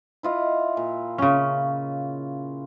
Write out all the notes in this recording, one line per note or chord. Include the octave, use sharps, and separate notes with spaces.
E4 F4 D#5
A#2
C#3 C#4